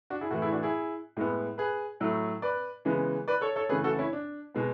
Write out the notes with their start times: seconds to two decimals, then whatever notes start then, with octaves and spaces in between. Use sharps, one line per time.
0.10 D4 F#4
0.21 E4 G#4
0.31 A2 E3 A3 F#4 A4
0.42 E4 G#4
0.52 D4 F#4
0.63 E4 G#4
1.17 A2 G#3 B3
1.58 G#4 B4
2.00 A2 F#3 A3
2.42 B4 D5
2.85 C#3 E3 G#3 B3
3.28 B4 D5
3.41 A4 C#5
3.56 A4 C#5
3.69 C#3 E3 A3 G#4 B4
3.84 F#4 A4
3.99 C#4 E4
4.13 D4
4.54 B2 G#3 B3